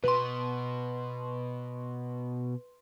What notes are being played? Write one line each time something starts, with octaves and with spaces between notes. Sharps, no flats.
B2 B4 C6